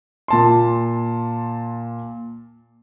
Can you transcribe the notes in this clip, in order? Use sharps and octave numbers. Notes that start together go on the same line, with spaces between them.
A#2 A5 C6